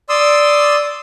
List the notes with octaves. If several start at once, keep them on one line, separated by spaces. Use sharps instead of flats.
D5 C6 D#6 E6